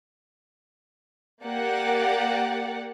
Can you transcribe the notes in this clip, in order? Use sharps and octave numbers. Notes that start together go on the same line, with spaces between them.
A#3 G4 D5 F#5